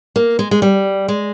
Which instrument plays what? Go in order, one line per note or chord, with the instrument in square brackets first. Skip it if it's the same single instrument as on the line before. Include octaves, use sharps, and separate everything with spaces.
[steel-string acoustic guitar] A#3
G#3
G#3
G3
G#3